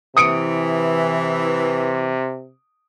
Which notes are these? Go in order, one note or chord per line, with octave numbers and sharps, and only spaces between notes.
C3 E3 D#6 C#7 D7